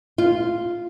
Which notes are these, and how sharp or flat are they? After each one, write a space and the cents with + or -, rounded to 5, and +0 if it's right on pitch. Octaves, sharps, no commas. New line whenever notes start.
F4 -5